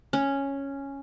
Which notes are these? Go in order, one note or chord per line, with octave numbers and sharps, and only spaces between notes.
C#4